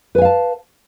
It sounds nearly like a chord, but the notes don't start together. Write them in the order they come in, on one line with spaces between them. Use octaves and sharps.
B4 G#5 F5 A5